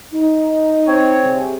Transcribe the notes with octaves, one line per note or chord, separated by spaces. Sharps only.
D#4
C4 C#5
C3 G3 G#4